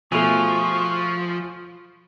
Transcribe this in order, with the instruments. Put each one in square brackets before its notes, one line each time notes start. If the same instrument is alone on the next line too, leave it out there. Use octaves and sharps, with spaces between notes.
[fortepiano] B2 A3 [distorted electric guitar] F3 [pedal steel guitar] F4 G#4 [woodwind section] C#6